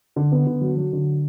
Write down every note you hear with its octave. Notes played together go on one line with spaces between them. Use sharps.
D3
B3
D3
F#3
F#3
D3